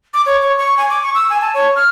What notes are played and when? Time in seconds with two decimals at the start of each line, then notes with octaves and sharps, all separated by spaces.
0.14 D6
0.26 C#5
0.41 C#5
0.58 C#6
0.77 G#5
0.90 D6
1.03 C#6
1.15 E6
1.30 G#5
1.41 A5
1.54 C#5
1.76 F6